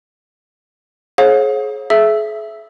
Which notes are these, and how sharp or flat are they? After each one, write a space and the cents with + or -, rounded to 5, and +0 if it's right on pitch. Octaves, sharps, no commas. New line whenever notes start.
G#4 +35 C#5 -40 F5 +45
G#4 +40 E5 +10 E6 +0